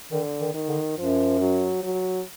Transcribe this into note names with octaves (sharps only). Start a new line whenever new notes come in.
D3 D#3
D#3
D#3
D3
F#2 F3
F#3
F#3